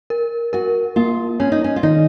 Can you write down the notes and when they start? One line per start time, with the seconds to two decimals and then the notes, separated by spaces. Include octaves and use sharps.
0.10 A#4
0.53 F#4 A#4
0.96 A#3 F4
1.40 C#4 C#5
1.52 D#4
1.64 C#4
1.76 F4
1.83 D#3 D#4